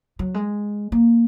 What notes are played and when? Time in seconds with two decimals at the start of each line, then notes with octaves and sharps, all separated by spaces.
0.19 F#3
0.34 G#3
0.92 A#3